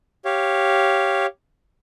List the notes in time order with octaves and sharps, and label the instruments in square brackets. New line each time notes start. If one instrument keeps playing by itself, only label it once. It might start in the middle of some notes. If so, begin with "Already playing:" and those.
[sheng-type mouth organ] G4 C#5 F5